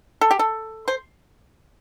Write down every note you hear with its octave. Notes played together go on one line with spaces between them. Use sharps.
A4
G4
A4
C5